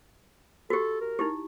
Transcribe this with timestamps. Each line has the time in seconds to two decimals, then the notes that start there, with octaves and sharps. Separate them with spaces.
0.70 F#4 G4 A4
1.01 A#4
1.19 D#4 E4 G4